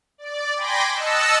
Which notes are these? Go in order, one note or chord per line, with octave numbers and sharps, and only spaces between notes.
D5
G5 G#5 B5 C6 D6 A#6
D#5 A5 E6 F#6 C#7